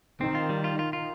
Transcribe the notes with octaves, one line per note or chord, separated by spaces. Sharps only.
D#3 C4
F4
G3
F4
F4
F4